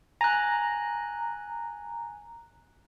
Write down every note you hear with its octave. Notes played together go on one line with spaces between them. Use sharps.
G#5 A#5 F#6